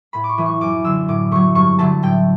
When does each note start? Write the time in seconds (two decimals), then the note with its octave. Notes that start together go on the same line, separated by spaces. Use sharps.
0.13 A2 B5
0.24 D6
0.29 C#6
0.38 E3 A3
0.45 C#6
0.61 F#2 D6
0.85 D3 F#3 E6
1.08 A2 D6
1.31 F#3 A3 C#6
1.55 G2 C#6
1.79 D3 F#3 A3 A5
2.03 A2 G5